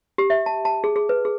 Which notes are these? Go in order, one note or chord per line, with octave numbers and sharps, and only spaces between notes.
G4
E5
A5
A5
G#4
G#4
B4
G#4